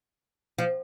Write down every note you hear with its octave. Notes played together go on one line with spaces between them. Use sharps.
F3